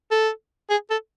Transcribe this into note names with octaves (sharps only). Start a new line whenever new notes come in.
A4
G#4
A4